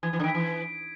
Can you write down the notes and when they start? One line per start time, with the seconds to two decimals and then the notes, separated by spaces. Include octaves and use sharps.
0.03 E3 G#6
0.13 E3
0.19 D3
0.24 D#3 B6 D7
0.35 E3
0.44 G#6